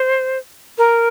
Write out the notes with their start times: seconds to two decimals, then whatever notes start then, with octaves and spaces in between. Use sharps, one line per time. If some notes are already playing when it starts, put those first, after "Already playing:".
Already playing: C5
0.78 A#4